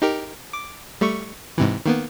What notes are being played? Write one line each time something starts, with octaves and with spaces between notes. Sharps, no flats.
D#4 G4 A#4
D6
G3 A3 C#6
G#2 C3 E3
D#3 A#3 B3